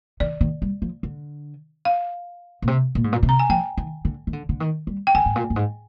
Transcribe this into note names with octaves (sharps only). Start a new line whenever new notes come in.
D#3 D5
D#3
G3
F3
D3
F5
A#2
C3
A#2
G#2
A#2
C3
A#5
G#5
F3 G5
D#3
D3
D#3
D3
D3
D#3
G3
G5
D3 G#5
G#2
A#2
G2
G#2